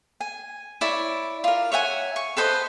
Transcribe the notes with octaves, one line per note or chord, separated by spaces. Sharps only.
G#5
E4 C#5 D5
F4 A#4
C#5 E5 F#5 G#5
C#6
A4 B4 C5 D#5